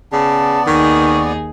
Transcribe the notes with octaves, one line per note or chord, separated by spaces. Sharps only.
C#3 B3 D5 A5
D#2 D#3 D#4 G#4 C#6